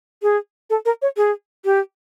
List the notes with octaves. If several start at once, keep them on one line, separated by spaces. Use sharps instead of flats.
G#4
A4
A#4
C#5
G#4
G4